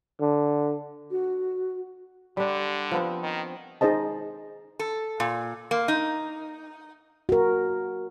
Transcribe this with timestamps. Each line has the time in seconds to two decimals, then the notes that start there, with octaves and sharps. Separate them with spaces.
0.21 D3
1.11 F#4
2.37 D3 G3 D4
2.91 F3 B3 C4
3.23 D#3
3.81 D#4 G#4 C5 D#5 A5
4.79 A4
5.20 A#2
5.71 A#3
5.88 D#4
7.29 F#4 A#4